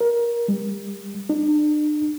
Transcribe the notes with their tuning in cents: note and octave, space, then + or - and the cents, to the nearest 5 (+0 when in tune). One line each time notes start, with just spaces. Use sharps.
A#4 +20
G3 +35
D4 +40